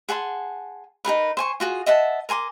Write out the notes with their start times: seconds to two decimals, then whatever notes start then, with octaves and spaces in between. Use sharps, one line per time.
0.09 G#4 F#5 A5 C6
1.05 D#4 G#4 A#4 B4
1.37 C5 G#5 C#6
1.60 F4 F#4 G#4
1.86 D#5 E5 F#5 A5
2.29 A#4 G#5 C6 D6